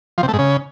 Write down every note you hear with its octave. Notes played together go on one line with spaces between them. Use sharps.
F3
C3
A3
G#2
C#3